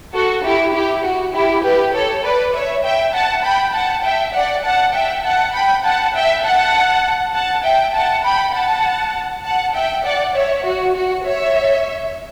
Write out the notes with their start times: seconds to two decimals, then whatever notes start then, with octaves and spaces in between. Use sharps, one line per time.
0.14 F#4 A4
0.43 E4 G4
0.73 E4 G4
1.03 F#4
1.34 E4 G4
1.64 G4 B4
1.93 A4 C#5
2.23 B4 D5
2.53 C#5 E5
2.84 E5 G5
3.13 F#5 A5
3.43 G5 B5
3.73 F#5 A5
4.03 E5 G5
4.34 D5 F#5
4.64 F#5 A5
4.94 E5 G5
5.24 F#5 A5
5.53 G5 B5
5.84 F#5 A5
6.14 E5 G5
6.44 F#5 A5
7.34 F#5 A5
7.64 E5 G5
7.94 F#5 A5
8.24 G5 B5
8.54 F#5 A5
9.45 F#5 A5
9.74 E5 G5
10.04 D5 F#5
10.34 C#5 E5
10.64 F#4
10.95 F#4
11.25 C#5 E5